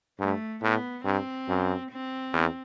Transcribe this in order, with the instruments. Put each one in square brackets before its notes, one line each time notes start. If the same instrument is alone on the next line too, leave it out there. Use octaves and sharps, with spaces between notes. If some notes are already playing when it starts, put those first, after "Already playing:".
[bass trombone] G2 [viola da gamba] A3
[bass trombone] A2 [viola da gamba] B3
[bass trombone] G2 [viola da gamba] C4
[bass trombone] F#2
[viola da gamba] C4
[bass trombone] E2